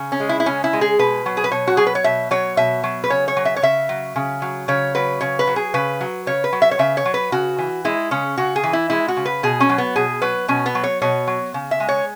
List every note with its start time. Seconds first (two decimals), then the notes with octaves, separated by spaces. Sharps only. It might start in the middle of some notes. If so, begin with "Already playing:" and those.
Already playing: C#3
0.12 C#4
0.20 G#3
0.29 E4
0.40 E4
0.46 C#3 C#4
0.64 E4
0.73 G#3
0.81 G#4
0.99 B2 B4
1.26 F#3
1.37 G#4
1.44 B4
1.51 B2 C#5
1.67 F#4
1.77 F#3 G#4
1.87 B4
1.95 C#5
2.04 B2 E5
2.31 F#3 C#5
2.57 B2 E5
2.84 F#3
3.04 B4
3.10 C#3 C#5
3.28 C#5
3.37 F#3
3.45 E5
3.56 C#5
3.62 C#3 E5
3.89 F#3
4.16 C#3
4.42 F#3
4.68 C#3 C#5
4.95 F#3 B4
5.21 C#3 C#5
5.39 B4
5.47 F#3
5.56 G#4
5.74 C#3 B4
6.01 F#3
6.26 C#3 C#5
6.44 B4
6.53 F#3
6.62 E5
6.71 C#5
6.79 C#3 E5
6.97 C#5
7.05 F#3
7.14 B4
7.32 C#3 F#4
7.58 E3
7.85 G#3 E4
8.11 C#3 C#4
8.38 C#3 F#4
8.56 G#4
8.64 E3
8.73 E4
8.90 G#3 E4
9.08 F#4
9.17 C#3
9.26 B4
9.43 B2 G#4
9.60 C#4
9.69 F#3
9.78 B3
9.96 B2 G#4
10.22 F#3 B4
10.48 B2 C#4
10.66 B3
10.75 F#3
10.83 C#5
11.02 B2 C#5
11.27 F#3
11.54 C#3
11.71 E5
11.80 G#3
11.89 C#5